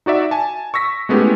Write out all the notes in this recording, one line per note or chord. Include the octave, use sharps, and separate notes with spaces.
D#4 F#4 D5 E5
G#5 A5
C#6 E6 A#6 B6
G#3 A3 B3 C#4 E4 G4